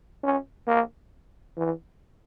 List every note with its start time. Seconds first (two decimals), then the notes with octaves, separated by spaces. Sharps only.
0.23 C#4
0.67 A#3
1.57 E3